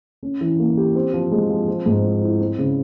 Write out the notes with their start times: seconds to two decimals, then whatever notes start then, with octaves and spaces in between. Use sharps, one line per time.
0.23 C#4
0.41 E3
0.59 A#3
0.77 G4
0.95 C4
1.13 F3
1.31 G#3
1.50 F3
1.68 C4
1.86 G#2
2.04 F3
2.22 E4
2.40 C4
2.58 C#3